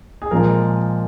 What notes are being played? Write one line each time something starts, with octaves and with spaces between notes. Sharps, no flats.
G#4
A#2 F3 G#3 A#4